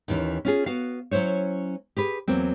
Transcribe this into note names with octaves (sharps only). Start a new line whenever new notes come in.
D#2 D#3 E3 C#4
C#4 F4 G#4
B3 F#4 F5
F#3 C#4 E4 C5 C#5
G4 G#4 B4
E2 F#3 A#3 C4